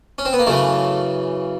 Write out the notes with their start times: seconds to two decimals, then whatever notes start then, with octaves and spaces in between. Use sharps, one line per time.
0.18 C#4
0.25 C4
0.33 B3
0.39 A#3
0.47 F#2 C#3 E3 A3